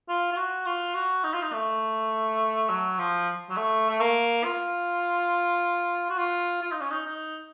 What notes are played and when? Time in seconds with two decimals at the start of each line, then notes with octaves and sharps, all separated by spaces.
0.08 F4
0.32 F4
0.36 F#4
0.66 F4
0.95 F#4
1.24 D#4
1.34 F4
1.42 D#4
1.53 A3
2.69 F#3
2.99 F3
3.50 F#3
3.57 A3
3.89 A3
4.00 A#3
4.44 F4
6.09 F#4
6.18 F4
6.62 F4
6.71 D#4
6.81 C#4
6.91 D#4
7.05 D#4